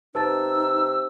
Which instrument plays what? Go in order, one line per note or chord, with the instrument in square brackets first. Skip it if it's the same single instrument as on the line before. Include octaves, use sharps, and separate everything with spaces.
[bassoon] C3 [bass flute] D#4 [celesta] B4 A5 A6 [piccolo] E6